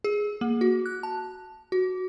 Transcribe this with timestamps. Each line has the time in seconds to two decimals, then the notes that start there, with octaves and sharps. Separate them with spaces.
0.04 G#4
0.41 A#3
0.61 F#4
0.86 F#6
1.03 A5
1.72 F#4